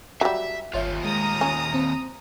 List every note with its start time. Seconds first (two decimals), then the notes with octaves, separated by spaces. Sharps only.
0.21 F#3 G3 E5
0.74 G1 D#2 F4 C#5 E5
1.05 G#3 A#5 D#6
1.41 C#4
1.74 C4